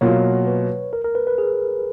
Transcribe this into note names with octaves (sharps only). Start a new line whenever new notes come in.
B2 F#3 A#3 F4 C#5
B4
A#4
A#4
B4
B4
G#4